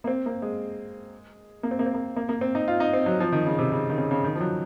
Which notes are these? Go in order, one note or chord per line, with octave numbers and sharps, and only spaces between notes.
A#3
C4
A#3
G#3
A#3
C4
A#3
C4
A#3
A#3
A#3
C4
D#4
F4
D#4
C4
F#3
F3
D#3
C#3
C3
C#3
D#3
C#3
C#3
D#3
F3
F#3